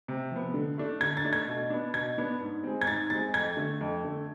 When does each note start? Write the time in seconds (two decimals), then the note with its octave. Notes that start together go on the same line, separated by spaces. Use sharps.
0.08 C3
0.31 F3 B3
0.54 D3
0.78 A3 D4
1.01 D3 G#6
1.17 A6
1.25 A3 D4
1.33 G#6
1.47 B2
1.70 B3 D4
1.94 B2 G#6
2.18 B3 D4
2.40 G#2
2.64 G#3 C4
2.81 G#6
2.87 G#2 A6
3.10 G#3 C4 A6
3.34 F2 G#6
3.57 D3 A3
3.81 F2
4.04 D3 A3